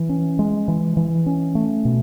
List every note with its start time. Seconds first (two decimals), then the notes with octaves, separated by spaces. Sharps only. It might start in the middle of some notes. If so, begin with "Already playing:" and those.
Already playing: E3
0.09 C#4
0.39 G#3
0.68 E3
0.97 E3
1.26 C#4
1.55 A3
1.85 B2